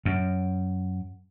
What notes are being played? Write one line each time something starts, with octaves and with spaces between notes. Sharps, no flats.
F#2